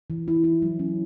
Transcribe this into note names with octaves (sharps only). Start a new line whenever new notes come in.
E3
E4
E4
F#3
C#4